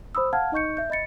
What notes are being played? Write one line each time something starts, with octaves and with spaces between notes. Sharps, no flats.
C5 B5 D#6 E6
F5 F#5 A5 F6 G#6
D#4 D#5 C#6 G6 C#7
E5 G6
D#5 B5 A6 C#7